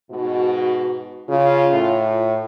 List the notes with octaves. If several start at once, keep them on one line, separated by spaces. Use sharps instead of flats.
G#2 B2 F#4
C#3 F4
A2